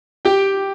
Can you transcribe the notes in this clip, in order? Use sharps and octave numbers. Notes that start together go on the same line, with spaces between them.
G4 G5